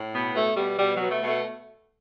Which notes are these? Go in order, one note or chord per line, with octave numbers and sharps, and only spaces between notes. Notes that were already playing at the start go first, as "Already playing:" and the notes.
Already playing: A2
B2 B3
B2 A3
B2 G3
B2 G3
F#3
B2
A3
B2
A3